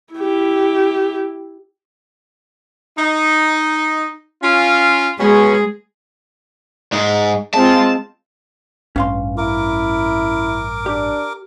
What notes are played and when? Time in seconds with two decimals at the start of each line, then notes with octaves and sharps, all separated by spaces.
0.14 E4 G4
2.98 D#4
4.43 C#4 F4
5.19 B2 G#3 B3 C#4 G#4
6.93 G#2 G#3
7.54 G#3 C4 F4 A5
8.96 A1 G2 C#4 F5 C6
9.37 E4 A#4 D6
10.86 D4 G4